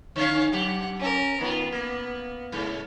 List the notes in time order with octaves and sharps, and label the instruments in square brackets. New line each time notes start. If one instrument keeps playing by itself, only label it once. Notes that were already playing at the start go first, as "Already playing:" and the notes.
[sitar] D3 C#4 [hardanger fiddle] C#5 F5
[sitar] F#2 G4 [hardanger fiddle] F#5
[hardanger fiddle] C#4 A#4
[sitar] D#3 F4 [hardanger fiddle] B3
[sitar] A#3
G#2 C#3